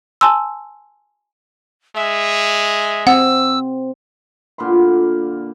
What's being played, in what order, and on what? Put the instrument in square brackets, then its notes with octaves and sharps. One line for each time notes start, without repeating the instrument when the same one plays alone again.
[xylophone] G#5 A5 C6 E6
[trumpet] G#3 [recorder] E5
[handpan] C4 [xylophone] F#5 [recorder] E6
[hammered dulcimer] A#2 D3 B5 C6